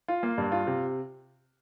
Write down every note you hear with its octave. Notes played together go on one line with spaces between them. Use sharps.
F4
A#3
G2
F4
C3